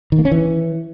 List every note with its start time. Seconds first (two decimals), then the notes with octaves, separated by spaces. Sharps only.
0.12 D#3
0.19 A#3
0.25 C#4
0.32 E3